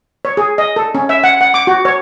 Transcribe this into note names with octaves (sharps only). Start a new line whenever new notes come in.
C#5
G#4
D#5
A4
C#4
E5
F#5
F#5
D6
F#4
C#5